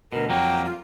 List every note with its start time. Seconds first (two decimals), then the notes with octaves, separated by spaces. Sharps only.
0.12 D2 B2 A#4
0.29 F2 F#3 A#3 G5
0.65 F4